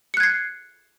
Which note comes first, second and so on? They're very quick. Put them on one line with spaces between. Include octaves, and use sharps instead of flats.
C#7 F#6 G#6 C7